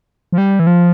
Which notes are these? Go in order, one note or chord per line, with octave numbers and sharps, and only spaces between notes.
F3
G3
E3
F3